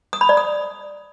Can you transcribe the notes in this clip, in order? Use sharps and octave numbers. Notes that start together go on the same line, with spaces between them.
D#6
B5
D5
D#6